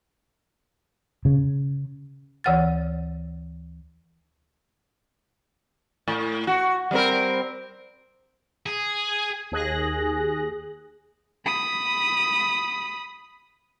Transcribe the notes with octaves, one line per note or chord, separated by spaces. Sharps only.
C#3
D2 E3 C#5 F#5 F6 A6
A2
F#4
G3 C4 A#4
G#4
D#2 G#4 F#6 A#6
B5 D#6